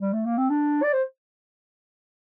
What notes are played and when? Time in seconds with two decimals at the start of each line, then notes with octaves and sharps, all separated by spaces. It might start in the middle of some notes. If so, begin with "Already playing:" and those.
0.01 G3
0.13 A3
0.26 A#3
0.38 C4
0.50 D4
0.83 D5
0.93 C5